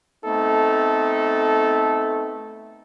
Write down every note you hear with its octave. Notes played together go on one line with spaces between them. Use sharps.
A3 B3 C4 D#4 A4